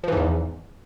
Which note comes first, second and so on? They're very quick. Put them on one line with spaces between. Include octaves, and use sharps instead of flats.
F3 E3 G#2 E2